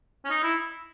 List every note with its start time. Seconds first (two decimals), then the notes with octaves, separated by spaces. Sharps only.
0.25 C#4
0.30 D#4
0.43 E4